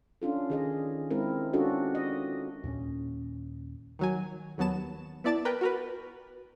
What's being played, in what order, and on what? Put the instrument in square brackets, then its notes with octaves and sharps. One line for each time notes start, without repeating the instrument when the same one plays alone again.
[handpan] C#4 D4 F4 A4
D#3 G#4 D#5
G#3 C4 E4 A#4
C#4 D4 F4 F#4 A4 D#5
D#5
[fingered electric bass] D#2 A#2 C4 C#4
[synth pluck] D#3 F#3 G#5
D#2 F#3 B3 A5 E7
B3 E4 D5 A5 D6 A6
A#4 B4 G5
F#4 A#4 B4